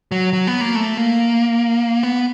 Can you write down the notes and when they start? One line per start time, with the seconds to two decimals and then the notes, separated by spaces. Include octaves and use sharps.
0.12 F#3
0.33 F#3
0.47 B3
0.61 A#3
0.75 A3
0.97 A#3
2.03 B3